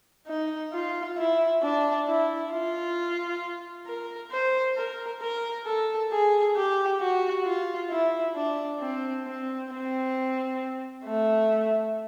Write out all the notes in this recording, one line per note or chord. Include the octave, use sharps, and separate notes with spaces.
D#4
F4
E4
D4
E4
F4
A#4
C5
A#4
A#4
A4
G#4
G4
F#4
F4
E4
D4
C4
C4
C4
A3